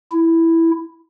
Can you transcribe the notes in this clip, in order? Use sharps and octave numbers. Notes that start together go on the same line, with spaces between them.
E4